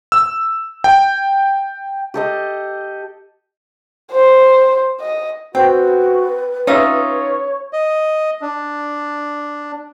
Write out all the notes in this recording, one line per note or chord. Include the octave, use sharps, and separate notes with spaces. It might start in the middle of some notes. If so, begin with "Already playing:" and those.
E6
G5
G4 A4 D#5
C5
D#5
C4 F#4 B4 G5
C#4 D#4 F4 C#5 E5 D#6
D#5
D4